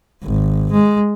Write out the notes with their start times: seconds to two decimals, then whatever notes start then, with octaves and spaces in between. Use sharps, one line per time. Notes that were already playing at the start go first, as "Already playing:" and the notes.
0.24 G#1
0.72 G#3